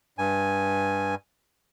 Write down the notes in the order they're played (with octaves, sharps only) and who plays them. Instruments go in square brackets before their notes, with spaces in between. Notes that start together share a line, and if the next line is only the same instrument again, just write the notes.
[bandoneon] G2 G#5